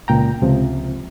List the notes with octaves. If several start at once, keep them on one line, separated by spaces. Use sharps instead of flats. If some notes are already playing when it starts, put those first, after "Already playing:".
C#2 A#2 G5 A#5
C#2 C3 F3